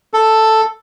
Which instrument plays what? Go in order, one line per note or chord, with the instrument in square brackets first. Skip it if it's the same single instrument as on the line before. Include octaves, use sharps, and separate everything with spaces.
[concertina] A4